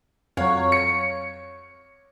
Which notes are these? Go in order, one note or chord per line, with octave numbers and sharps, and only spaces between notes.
F2 F#3 C#5 F5
C#7